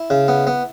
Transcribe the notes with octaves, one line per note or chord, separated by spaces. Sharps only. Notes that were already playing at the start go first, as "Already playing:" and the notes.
Already playing: E4
C#3
B3
B3